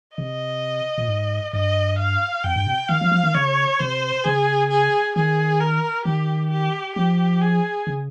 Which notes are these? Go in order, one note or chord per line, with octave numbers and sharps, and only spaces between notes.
C3 D#5
A#2
G#2
G2 D#5
F5
F2 G5
G2
C3
D#3 F5
F3
F3
D#3
C#3 C#5
C3 C5
C#3 G#4
G#4
D#3 G#4
A#4
D#3 G4
G4
F3 G4
G#4
C#3